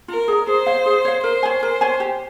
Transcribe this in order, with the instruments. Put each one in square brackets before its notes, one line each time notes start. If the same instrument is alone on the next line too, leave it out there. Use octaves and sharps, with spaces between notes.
[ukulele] F4 [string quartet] A#4
[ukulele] G#4 D#5 A#5
[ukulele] G#4 [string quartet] C5
[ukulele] C#5 F5
G#4
C#5 F5
[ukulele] A#4 [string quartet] C5
[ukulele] C#5 G#5
[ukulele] A#4 [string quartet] C5
[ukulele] C#5 G#5
G4